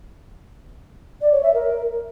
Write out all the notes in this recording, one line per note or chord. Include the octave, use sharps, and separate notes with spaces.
D5
C#5
E5
A#4